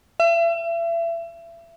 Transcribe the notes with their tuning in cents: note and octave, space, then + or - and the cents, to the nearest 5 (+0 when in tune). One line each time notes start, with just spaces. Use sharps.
E5 +35